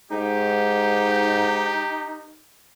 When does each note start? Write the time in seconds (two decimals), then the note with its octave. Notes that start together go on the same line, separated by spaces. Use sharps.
0.11 G#2 D#4 G4